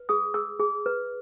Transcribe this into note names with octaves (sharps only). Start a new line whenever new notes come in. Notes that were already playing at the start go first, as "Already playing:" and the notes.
Already playing: B4
G#4 D#6
G#4 E6
G#4
B4